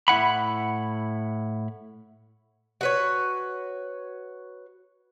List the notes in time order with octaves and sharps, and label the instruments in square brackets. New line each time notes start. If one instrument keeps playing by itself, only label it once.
[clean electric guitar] A2 E4 F#5 B5
[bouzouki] F#4 B4 C#5